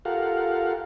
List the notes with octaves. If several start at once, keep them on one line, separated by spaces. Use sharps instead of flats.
F4 G4 A4 A#4 F5 F#5